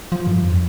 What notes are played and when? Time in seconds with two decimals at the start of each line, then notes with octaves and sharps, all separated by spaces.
0.12 F3
0.27 G2
0.42 F2